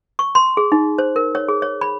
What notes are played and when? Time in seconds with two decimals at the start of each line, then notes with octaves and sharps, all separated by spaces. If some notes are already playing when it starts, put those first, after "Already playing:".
0.19 C#6
0.35 C6
0.57 G#4
0.72 D#4
0.98 C5
1.16 A#4
1.35 C#5
1.48 G#4
1.62 C#5
1.81 B5